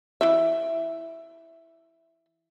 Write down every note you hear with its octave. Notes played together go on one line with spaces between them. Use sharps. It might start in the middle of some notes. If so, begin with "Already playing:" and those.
E3 E4 E5